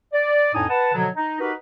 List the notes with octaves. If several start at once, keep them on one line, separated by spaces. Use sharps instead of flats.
D5
F2 A2 D4 D#4 G#5 D#6
B4 F#5 A5
B2 D3 F3 F#3
D#4
D#4 F#4 G4 A#4 B4